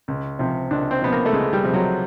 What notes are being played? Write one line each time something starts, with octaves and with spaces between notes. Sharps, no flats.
C#2
C3 F3
C#2 D4
C4
C3 F3 B3
A#3
A3
C#2 G#3
G3
C3 F3
F#3